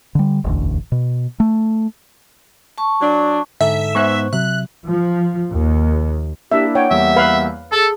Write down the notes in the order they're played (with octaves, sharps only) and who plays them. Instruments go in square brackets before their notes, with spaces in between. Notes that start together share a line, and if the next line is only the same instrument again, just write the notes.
[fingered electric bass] D3 G3
E1 A1 D2
B2
A3
[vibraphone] A5 C#6
[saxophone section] F#3 D4
[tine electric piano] G#2 A4 [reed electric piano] D3 [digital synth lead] E5
[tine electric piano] G#2 B3 F#6 [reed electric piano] C5 C#6
[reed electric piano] C3 F#3 [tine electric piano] E5 [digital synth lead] F#6
[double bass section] F3
D#2
[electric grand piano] A#3 D4 E4 [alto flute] G4 [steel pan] E5
[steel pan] C#5 G5 [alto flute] F#5
[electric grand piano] E2 G3 A#3 [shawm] E5
[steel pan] B4 F5 B5
[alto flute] G#4 [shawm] A4 [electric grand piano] A5